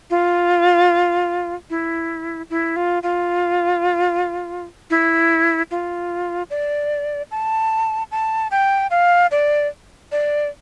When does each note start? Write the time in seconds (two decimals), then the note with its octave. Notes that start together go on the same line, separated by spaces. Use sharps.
0.10 F4
1.70 E4
2.50 E4
2.76 F4
3.03 F4
4.90 E4
5.71 F4
6.50 D5
7.31 A5
8.11 A5
8.51 G5
8.91 F5
9.31 D5
10.12 D5